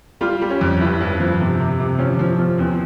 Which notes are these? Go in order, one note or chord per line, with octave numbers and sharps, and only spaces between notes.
G3 F4
G3
C#4
F2
G2 E4
G2
F3
C3
C3
C3
F3 C#4
F3
F3
E2 C4